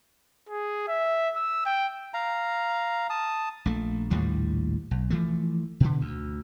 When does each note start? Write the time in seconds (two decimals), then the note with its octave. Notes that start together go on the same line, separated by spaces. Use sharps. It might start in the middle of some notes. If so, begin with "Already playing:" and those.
0.49 G#4
0.88 E5
1.36 E6
1.66 G5
2.14 F5 A#5
3.10 A5 D#6
3.66 A#1 A3
4.10 A#1 D#2 A2 G3
4.91 B1
5.10 E3 F3 A3
5.80 B2 D3
6.01 D2